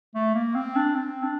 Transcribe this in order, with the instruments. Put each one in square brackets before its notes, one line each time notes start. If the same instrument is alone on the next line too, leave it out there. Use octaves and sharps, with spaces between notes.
[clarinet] A3
A#3
C4
D4
C4
D4